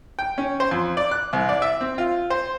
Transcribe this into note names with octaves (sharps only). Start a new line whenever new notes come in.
G5
C#4
C5
F2
D5
F#6
C2
D5
E5
C4
F4
C5